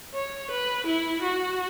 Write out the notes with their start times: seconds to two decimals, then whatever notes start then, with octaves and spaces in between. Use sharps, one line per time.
0.14 C#5
0.50 B4
0.86 E4
1.21 F#4